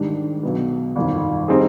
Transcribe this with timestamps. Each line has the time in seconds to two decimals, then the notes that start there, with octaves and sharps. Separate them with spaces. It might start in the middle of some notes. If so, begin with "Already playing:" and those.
Already playing: G#2 D#3 G3 D4
0.43 B1 B2 B3
0.96 G1 F2 D#3
1.48 G3 C4 D#4 G#4